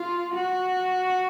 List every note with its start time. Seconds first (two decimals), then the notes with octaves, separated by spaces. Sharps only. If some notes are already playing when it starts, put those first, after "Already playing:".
Already playing: F4
0.35 F#4